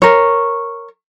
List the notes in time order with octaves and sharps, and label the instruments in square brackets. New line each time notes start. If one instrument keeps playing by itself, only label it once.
[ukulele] A#4 C#5